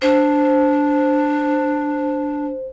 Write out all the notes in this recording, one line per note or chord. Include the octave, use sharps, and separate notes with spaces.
D4 C5